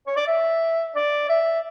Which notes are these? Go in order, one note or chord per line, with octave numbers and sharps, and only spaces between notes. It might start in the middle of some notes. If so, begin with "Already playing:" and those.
C#5
D5
E5
D5
E5